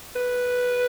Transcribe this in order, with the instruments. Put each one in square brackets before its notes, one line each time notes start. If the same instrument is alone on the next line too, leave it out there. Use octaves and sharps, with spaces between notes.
[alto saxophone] B4